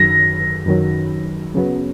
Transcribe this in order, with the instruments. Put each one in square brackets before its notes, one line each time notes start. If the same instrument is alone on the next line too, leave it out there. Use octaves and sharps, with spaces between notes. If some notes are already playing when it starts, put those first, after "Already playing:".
Already playing: [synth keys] F#2 D#3 F#3 [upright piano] A#6
[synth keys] F#2 D#3 F#3
F#2 C#3 F#3 B3